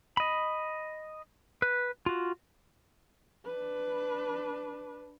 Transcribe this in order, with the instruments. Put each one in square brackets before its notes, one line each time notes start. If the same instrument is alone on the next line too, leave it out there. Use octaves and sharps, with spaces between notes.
[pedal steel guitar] D#5 B5
B4
F4 F#4
[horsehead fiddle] D4 B4